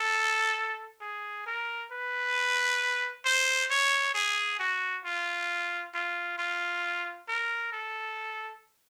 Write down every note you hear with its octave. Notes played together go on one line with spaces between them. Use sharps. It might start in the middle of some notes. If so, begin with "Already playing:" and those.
Already playing: A4
G#4
A#4
B4
C5
C#5
G#4
F#4
F4
F4
F4
A#4
A4